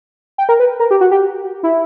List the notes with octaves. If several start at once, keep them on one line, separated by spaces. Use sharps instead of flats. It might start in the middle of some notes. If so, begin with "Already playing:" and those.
G5
A#4
B4
A#4
G4
F#4
G4
E4